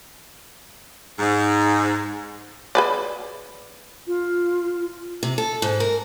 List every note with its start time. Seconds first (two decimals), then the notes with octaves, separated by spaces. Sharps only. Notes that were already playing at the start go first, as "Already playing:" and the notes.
1.19 G#2
2.75 G#4 B4 D5
4.07 F4
5.23 C3
5.38 A4
5.62 G#2
5.80 A#4